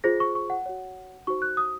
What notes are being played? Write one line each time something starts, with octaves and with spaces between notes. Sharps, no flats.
F4 G#4 C5 A#6
C#6
C#6
F#5
F#4 C#5
D#4 F#4 C5 C#6
F#6
D#6